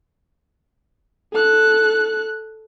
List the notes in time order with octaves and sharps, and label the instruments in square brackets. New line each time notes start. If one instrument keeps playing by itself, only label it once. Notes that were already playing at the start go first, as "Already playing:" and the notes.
[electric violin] A4 F#6